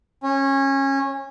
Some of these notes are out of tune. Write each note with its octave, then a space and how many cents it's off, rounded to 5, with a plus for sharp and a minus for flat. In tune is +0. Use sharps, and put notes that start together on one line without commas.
C#4 -20